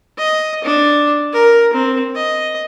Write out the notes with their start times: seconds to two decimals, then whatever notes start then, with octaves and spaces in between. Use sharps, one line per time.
0.18 D#5
0.64 D4
1.33 A#4
1.74 C4
2.16 D#5